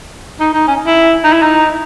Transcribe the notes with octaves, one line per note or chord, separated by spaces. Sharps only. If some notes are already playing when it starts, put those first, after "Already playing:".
D#4
D#4
C#4
E4
D#4
E4
D#4